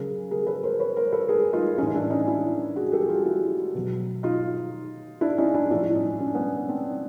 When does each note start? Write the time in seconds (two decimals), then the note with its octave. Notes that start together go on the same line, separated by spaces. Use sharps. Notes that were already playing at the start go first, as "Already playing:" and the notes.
Already playing: C#3 F#3 G#4 A#4
0.31 G#4 A#4
0.47 A4 B4
0.63 A#4 C5
0.79 B4 C#5
0.96 A#4 C5
1.12 A4 B4
1.29 G#4 A#4
1.53 D#4 F4
1.78 A2 E3 C#4 D#4
1.94 D4 E4
2.10 C#4 D#4
2.27 D4 E4
2.76 F#4 G#4
2.92 G4 A4
3.02 G#4
3.09 F4 G4
3.25 E4 F#4
3.75 B2 F#3
4.23 D#4 F4
5.21 D4 E4
5.38 C#4 D#4
5.54 D4 E4
5.71 A2 F3 D4 E4
5.95 C#4 D#4
6.20 C#4
6.28 D4
6.34 B3 C#4
6.69 C4 D4